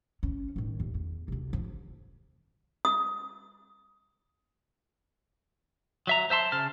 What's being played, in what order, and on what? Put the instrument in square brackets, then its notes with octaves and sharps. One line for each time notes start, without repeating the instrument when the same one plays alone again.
[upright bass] C#4
A2 D#3
D#2
E2
D2 C3
F3
[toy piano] D#6
[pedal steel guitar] F#3 E5 A#5
C5 E5 A5 C6
C#3 A5 F6